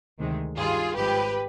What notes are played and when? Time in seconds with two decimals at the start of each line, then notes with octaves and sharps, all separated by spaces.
0.19 D2 C3 D#3 G#3
0.57 G2 D#3 G3 F4 G#4
0.95 G#1 G#2 F3 G#3 G4 B4